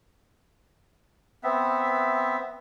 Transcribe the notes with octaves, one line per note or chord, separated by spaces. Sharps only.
B3 C4 E5